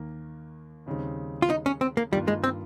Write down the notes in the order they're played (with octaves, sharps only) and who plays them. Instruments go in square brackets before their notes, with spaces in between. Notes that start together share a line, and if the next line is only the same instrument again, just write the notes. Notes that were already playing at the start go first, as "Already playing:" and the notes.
Already playing: [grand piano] D#2 D#3 A#3
D#2 C#3 G3 C4 D#4
[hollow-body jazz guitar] F4
D#4
C#4
C4
A#3
[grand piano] G2 D#3 A#3 F4 [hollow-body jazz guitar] G3
[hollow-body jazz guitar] G#3
C4